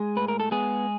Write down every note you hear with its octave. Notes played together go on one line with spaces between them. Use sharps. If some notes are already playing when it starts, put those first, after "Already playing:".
Already playing: G#3 G#4
A2 B4
A#4
A4
G#3 B3 G#4